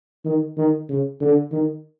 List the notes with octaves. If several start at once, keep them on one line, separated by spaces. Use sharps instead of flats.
D#3
D#3
C#3
D3
D#3